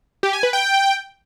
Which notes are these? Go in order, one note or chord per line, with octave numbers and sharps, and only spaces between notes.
G4
G#5
B4
G5